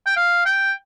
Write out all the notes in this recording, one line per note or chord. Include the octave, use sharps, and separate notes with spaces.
G5
F5
G5